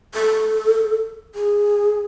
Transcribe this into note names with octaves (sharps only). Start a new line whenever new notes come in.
A4
G#4